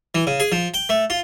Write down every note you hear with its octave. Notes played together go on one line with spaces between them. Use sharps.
E3
C#3
G#4
F3
G5
A3
F4